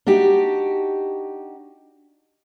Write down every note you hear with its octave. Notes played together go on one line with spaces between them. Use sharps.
D4 D#4 F#4 G4